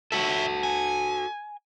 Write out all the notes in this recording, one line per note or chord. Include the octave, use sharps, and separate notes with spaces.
F#4 A4 C#5 E5
G#5